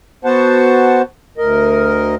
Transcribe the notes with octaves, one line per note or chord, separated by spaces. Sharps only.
B3 F#4 C5 F#5 A5
D2 A#4 D#5